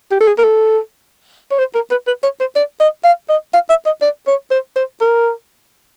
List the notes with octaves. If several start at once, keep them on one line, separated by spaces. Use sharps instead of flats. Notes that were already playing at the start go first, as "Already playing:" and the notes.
G4
A4
G#4
A#4
A4
C#5
C5
A#4
B4
B4
C#5
C5
D5
D#5
F5
D#5
F5
E5
D#5
D5
C#5
C5
C5
A#4